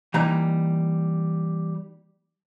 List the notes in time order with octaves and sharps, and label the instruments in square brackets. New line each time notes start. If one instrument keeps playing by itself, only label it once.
[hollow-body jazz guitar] E3 G3 A#3 D#4 A#5